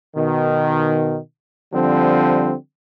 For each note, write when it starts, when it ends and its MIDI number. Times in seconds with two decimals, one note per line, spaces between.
0.16 1.16 47
0.16 1.16 51
1.74 2.54 50
1.74 2.54 53
1.74 2.54 55
1.74 2.54 60